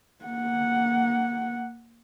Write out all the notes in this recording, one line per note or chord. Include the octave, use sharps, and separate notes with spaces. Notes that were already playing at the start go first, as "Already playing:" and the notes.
A#3 F#5